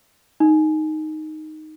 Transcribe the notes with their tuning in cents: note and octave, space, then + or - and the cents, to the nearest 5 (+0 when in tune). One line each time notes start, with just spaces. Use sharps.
D#4 +0